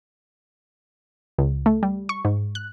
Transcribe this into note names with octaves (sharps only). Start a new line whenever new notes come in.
C#2
A3
G3
C#6
G#2
F#6